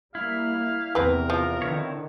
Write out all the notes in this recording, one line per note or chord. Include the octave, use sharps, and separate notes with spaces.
G3 A#3 E4 F5
E2 C3 C4 A#4 B4
F3
D3 D#3 C4 E4 C#5